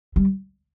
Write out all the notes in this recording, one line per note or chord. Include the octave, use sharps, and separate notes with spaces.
G3